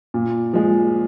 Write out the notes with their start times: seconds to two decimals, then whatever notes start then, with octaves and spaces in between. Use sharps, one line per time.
0.14 A#2
0.53 F3 G#3